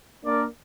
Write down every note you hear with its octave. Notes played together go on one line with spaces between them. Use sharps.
A#3 D4 A#4 D5